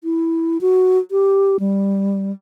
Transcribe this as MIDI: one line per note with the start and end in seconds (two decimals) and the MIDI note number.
0.04 0.58 64
0.61 0.98 66
1.11 1.57 67
1.60 2.32 55